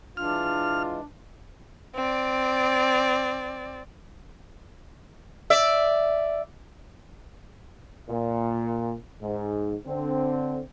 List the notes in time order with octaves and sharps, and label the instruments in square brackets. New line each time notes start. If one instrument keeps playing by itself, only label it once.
[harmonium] E3 G#3 [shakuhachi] D4 [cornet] F4 [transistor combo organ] F6
[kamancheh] C4 D5
[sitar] D5 E5
[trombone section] A#2
G#2
D3 C4